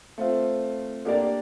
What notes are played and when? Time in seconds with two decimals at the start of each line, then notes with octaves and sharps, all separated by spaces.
0.18 A3 C4 F4
1.05 A#3 D4 G4 A#4 D5